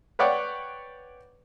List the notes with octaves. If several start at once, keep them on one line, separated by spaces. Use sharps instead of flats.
B4 C#5 D5 F#5 G5